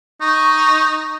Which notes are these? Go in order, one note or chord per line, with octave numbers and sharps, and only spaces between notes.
D#4 C#6